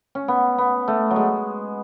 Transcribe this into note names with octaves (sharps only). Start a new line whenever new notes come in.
C#4
B3
B3
A3
F#3
G#3